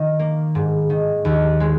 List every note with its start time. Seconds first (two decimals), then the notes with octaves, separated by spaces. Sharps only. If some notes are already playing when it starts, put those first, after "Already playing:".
Already playing: D#3
0.19 A#3
0.55 G#2
0.90 D#3
1.25 D#2
1.60 G#3